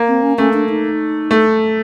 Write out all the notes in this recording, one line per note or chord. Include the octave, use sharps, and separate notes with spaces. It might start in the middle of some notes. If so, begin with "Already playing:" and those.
Already playing: A#3
C4
C#4
A3 C#4
D4
D#4
A3